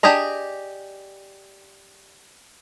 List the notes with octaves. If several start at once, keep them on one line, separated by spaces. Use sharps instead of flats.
D4 G4 G#4 D#5 A#5